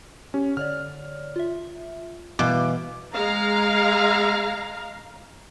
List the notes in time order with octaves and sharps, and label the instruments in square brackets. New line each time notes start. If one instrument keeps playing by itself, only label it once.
[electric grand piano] C#4 [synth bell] G4
[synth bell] D3 C#5 D5 [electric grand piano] F6
[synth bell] F4 E5
[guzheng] B2 [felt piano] E3 F5 F#5 [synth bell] G3 [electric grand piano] D6
[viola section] G#3 F5 A#5